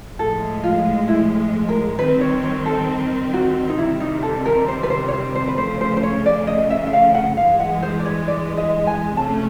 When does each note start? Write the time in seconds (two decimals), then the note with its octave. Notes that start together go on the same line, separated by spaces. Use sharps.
0.19 A2 F3 G#3 A4
0.64 F4
1.08 E4
1.69 A#4
1.98 D#3 G3 C4 B4
2.21 C#5
2.43 C#5
2.66 A4
3.33 F#4
3.69 D#4
3.78 C3 D#3 G3 C4 E4
4.00 D#4
4.23 A4
4.46 A#4
4.68 C5
4.83 B4
4.90 C5
5.08 C#5
5.13 C5
5.35 C5
5.48 B4
5.58 C#3 F3 A3 C5
5.81 C5
5.97 C5
6.03 C#5
6.26 D5
6.47 D#5
6.70 E5
6.87 E5
6.93 F5
7.15 F#5
7.37 G2 E3 G#3 F5
7.60 F#5
7.82 C5
7.99 D5
8.05 C#5
8.28 D5
8.57 D#5
8.87 G#5
9.17 C3 F3 A3 C#4 A5